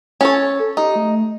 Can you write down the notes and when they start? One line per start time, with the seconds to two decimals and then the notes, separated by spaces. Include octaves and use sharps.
0.21 C#4 A4 C#5
0.59 A4
0.77 D#4 G4
0.96 A3